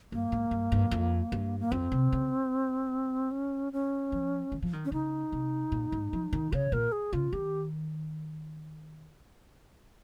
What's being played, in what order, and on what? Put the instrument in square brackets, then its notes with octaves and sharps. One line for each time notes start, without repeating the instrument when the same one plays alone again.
[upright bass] G2 [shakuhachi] A#3
[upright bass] G#2
G2
G2
F2
G2
[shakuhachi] A#3
[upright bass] F2 [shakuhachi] C4
[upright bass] C3
C#3
[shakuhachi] C#4
C#4
[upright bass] F3
D#3
F3
D#3
[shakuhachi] C#4
[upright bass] C#3 [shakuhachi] D#4
[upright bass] C3
A#2
G#2
F3
D#3
[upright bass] C#3 [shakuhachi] C#5
[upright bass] A#2 [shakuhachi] A#4
[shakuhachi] G#4
[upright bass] C#3 [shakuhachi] F4
[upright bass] D#3 [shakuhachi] G4